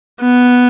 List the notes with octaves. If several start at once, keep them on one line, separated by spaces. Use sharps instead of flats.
B3